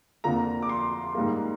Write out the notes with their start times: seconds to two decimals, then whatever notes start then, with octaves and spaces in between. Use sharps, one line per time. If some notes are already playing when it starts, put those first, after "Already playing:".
0.24 F2 D3 F3 A#3 A#5
0.62 D6
0.69 C6
1.15 G#2 G3 A#3